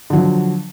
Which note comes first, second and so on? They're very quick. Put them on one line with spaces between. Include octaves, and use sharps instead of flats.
D3 F#3 F3